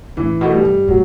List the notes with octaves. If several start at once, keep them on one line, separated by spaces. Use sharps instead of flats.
A2 E3
B2 A3
G3
G2
A2 F#3